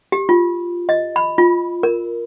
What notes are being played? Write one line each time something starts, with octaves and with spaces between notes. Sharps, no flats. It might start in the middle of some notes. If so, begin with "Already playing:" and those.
G4
F4
D#5
B5
F4
A#4